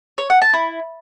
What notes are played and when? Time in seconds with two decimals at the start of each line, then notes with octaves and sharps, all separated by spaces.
0.18 C#5
0.30 F#5
0.42 A5
0.53 E4